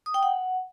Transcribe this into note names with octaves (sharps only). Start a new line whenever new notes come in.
D#6
G5
F#5